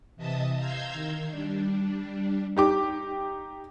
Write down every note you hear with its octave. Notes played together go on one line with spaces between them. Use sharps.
C3 E3 D#5 E5 A5 D#6
F5 A#5 C6 E6 G6 G#6
D#3
G3 D4
D#4 G4 D6